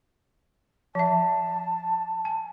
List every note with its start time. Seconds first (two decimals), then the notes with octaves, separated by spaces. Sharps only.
0.95 F3 E5 A5
2.25 G#5